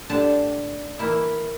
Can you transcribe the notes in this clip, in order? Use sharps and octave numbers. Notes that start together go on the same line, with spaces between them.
A2 D3 D4 G4 D5 A5
E3 A#3 E4